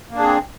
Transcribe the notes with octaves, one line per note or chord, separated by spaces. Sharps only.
A#3 C4 D4 G#4